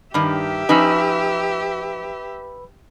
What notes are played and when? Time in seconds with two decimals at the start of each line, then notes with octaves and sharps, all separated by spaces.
0.14 G2 D#3 G4 E5
0.69 F3 C#4 D#4 B4 B5 E6